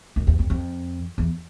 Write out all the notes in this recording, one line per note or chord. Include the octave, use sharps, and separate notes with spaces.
F#2
E2
F2
F2
E2